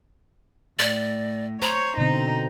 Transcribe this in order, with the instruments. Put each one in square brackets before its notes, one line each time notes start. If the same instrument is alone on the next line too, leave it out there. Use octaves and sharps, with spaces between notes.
[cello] A2 [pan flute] D5
[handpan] C5 [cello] C#5 [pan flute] A#5
[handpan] B2 D3 C4 [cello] D#4